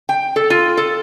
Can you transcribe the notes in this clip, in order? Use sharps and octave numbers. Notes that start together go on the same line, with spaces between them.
G5
A4
F4
A4